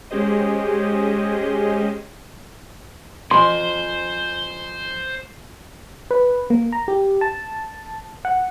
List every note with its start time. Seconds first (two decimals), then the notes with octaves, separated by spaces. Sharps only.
0.11 G#3 C#4 G4 G#4 C5 D#5
3.31 F2 C5 G#5 C6
6.11 B4
6.50 A#3
6.72 A#5
6.88 G4
7.21 A5
8.25 F#5